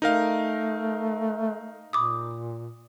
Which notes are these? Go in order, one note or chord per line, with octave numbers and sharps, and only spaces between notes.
A3 D#4 A#4 F5
A#2 B5 D6 D#6